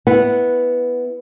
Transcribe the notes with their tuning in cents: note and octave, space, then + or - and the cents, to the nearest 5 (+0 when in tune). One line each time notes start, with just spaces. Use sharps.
B3 +0 E4 +0 F#5 -10